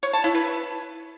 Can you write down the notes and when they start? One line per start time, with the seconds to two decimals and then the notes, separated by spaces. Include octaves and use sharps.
0.03 C#5
0.13 A5
0.24 E4
0.35 B4